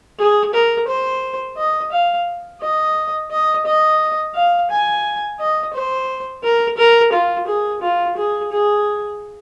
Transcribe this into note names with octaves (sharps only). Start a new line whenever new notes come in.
G#4
A#4
C5
D#5
F5
D#5
D#5
D#5
F5
G#5
D#5
C5
A#4
A#4
F4
G#4
F4
G#4
G#4